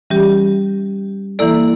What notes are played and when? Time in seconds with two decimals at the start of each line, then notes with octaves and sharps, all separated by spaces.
0.10 E3 G3 C#4 G4
1.39 E3 A#3 E4 A4 D5